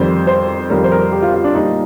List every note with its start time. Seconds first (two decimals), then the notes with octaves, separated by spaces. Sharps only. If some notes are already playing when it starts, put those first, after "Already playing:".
Already playing: F2 D#3 G3 C5
0.27 C5
0.70 F2 D#3 G3 A#4
0.84 C5
0.92 A#4
1.12 G4
1.22 F4
1.34 F4
1.44 D4
1.54 A#2 G3 D#4